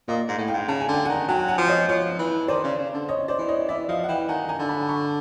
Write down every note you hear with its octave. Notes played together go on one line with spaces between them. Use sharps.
A#2 D#5 F5
G#2
A2
F5 G5
G#2
C#3 A5
G#5
D3 G5
F#5 G#5
D#3
F#3 G5 A5
G5
F#5 G#5
F3
C#5 D#5
F3 C#5
E3
D#3 C5 D5
C#3
C#3
D3
C#5 D#5
C5 D5
E3
C#5 D#5
E3 D5 E5
F3 D#5 F5
F#5
E3 F5 G5
D#3 F#5 G#5
G#5 A#5
D3
A5 B5
B5 C#6